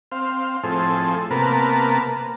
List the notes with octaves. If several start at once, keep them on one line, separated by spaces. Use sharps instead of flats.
C4 F5
A2 F3 C4 G#4 A4
C3 A#3 B3 A#4 B4 A5